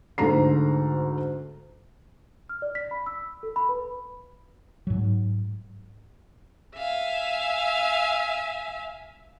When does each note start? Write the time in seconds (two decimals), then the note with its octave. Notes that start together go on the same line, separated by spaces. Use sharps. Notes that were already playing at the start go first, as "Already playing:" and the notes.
0.18 D2 G#2 A4 A#5 C7
2.49 F6
2.62 D5
2.75 B6
2.91 B5
3.06 E6
3.43 A4
3.56 B5
3.69 B4
4.87 G#2 F#3
6.77 E5 F5 G#5